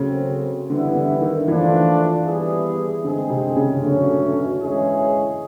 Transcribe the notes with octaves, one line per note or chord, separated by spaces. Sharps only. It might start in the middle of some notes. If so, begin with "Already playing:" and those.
Already playing: C#3 F#3 A3 C4
D3 E3 G3 B3 E4
D3
D#3
E3 F3 A3 D4 F4
G3 B3 E4 G#4
D3 G#3 C4 D#4 G#4
C3
C#3
B2 D3 F#3 A3 C#4
E3 G#3 C#4 E4 G#4